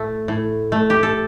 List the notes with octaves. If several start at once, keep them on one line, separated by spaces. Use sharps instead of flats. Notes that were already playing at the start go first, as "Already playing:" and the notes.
Already playing: A2 A3
A2
A3
G4
A4